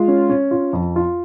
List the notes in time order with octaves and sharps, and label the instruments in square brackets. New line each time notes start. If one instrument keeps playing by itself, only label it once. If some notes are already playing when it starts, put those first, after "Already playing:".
Already playing: [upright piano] G#3 [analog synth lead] F4
[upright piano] C#4
C#4
F4
F2
F4